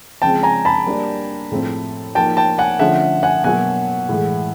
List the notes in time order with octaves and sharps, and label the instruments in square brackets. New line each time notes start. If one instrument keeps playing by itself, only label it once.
[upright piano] C#3 F3 G#3 C4 [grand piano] G5 A5
[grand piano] G#5 A#5
A5 B5
[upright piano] G3 A#3 D4
A2 F3 A3 C4
[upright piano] F3 A#3 D#4 F#4 [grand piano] G5 A5
[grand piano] G5 A5
F#5 G#5
[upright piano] D3 F3 A3 C#4 [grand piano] E5 F#5
[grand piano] F#5 G#5
[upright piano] B2 F#3 A#3 [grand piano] F#5 G#5
[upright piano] A2 E3 G#3